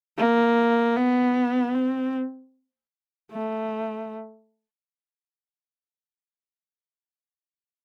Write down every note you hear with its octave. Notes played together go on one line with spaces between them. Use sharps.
A#3
B3
C4
A3